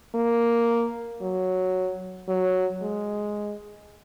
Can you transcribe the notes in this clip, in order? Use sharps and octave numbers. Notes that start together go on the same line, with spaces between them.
A#3
F#3
F#3
G#3